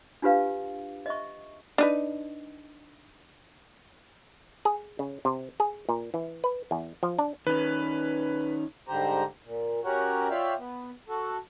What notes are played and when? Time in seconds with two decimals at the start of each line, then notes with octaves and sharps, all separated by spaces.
0.22 D4 F4 G4 B4 F5
1.06 D#5 E5 C#6
1.78 D4 D#4 B4
4.65 G#4
4.99 C#3
5.25 C3
5.60 G#4
5.89 A#2
6.14 E3
6.44 B4
6.71 E2
7.03 F3
7.19 D4
7.47 D#3 C#4 B4
8.88 G#2 D3 G3 G4 C5 A#5
9.46 A#2
9.85 C#4 F#4 G4 A#4 C#5 F#5
10.30 F4 C#5 D5 E5 F5 G5
10.59 B3
11.09 F#4 A4